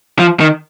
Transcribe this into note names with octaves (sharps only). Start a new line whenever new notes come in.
F3
D#3